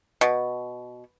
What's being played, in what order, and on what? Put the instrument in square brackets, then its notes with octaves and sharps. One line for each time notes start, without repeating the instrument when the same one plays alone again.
[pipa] B2